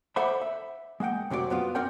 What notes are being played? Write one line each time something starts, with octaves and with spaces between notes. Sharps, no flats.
A4 C5 D5 E5 F#5 B5
E5
G#3 A#3 F#5 G5
F#2 C3 F#3 G4 D5
F#2 B3 F4
C4 C#4 A#4 D5 F#5 G5